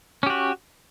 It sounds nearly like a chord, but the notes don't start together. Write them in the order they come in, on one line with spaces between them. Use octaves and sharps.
C#4 G4 F#4